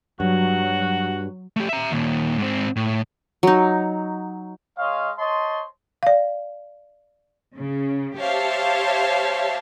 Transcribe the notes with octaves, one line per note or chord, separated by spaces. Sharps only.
G2 F#3 F#4
A3 G4
E5 A#5
D#2 A#2
G#2 C4
A2
F#3 D#4
G#3 C#5 D#5 F5
C5 C#5 D#5 A5 C6
D5 F5
C#3
G4 C5 C#5 E5 F5 A5